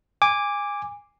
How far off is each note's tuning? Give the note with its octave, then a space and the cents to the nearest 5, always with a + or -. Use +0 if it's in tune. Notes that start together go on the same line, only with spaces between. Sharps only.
G#5 -20 D6 +0